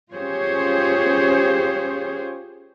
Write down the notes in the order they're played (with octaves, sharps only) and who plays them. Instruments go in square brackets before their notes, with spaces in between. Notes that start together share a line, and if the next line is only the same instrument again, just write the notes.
[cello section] C#4 F4 G4 G#4 C5 C#5